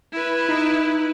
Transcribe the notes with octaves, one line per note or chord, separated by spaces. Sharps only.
E4 B4
D#4